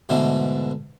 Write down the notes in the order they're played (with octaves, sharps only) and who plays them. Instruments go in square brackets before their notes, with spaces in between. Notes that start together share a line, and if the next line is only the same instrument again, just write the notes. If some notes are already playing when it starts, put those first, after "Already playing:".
[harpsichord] G#2 B2 D3 E3 A3